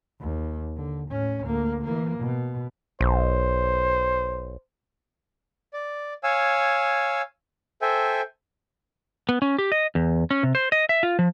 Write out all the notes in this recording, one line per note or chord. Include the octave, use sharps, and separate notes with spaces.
D#2
D3
A2 C#4
D2 A#3
E3 A#3
B2
B1 C5
D5
C#5 F5 G#5 E6
A4 C5 E5 G5 G#5
B3
C#4
G4
D#5
E2
C#4
C3
C5
D#5
E5
F4
F3